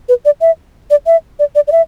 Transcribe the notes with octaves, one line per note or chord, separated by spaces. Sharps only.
B4
D5
E5
D5
E5
D5
D5
D5
E5